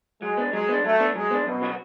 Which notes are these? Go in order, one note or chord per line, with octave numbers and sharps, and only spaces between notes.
F#3 G#3
B3 D4
F#3 G#3
B3 D4
F#3 A3
B3 D4
F#3 G#3
B3 D4
F#2 B2
C#3 F#3 B3 F#4